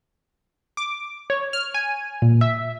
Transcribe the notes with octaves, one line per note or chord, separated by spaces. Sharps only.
D6
C#5
F6
G#5
A#2
E5